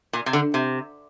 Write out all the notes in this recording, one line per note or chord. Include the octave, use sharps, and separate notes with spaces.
A#2
C3
D3
C3